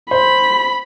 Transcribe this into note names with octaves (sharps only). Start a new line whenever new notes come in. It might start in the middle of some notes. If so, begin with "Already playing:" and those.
C5 B5